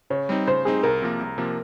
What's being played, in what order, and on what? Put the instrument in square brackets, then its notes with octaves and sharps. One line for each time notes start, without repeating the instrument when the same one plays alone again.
[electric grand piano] C#3 [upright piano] C#5
[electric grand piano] G3 C4 D#4
[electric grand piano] C#3 [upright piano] C5
[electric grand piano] G3 C4 D#4 [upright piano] G#4
[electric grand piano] C2 [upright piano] A#4
[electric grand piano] C3 F3 A#3
C2
C3 F3 A#3